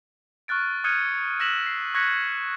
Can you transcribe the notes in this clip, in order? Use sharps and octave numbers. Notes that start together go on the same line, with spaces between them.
C#6 F6 F#6 A6 D7
D#6 F6 F#6 G#6 C#7 D#7
E6 F#6 A#6 B6 E7 F#7
C7
C#6 F#6 G#6 A#6 B6 C#7